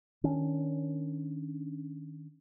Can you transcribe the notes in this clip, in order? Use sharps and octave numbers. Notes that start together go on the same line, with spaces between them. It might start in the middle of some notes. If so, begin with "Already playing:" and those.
D#3 C#4 D4